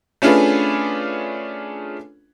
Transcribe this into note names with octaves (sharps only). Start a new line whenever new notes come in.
A3 C#4 D4 F4 G#4 B4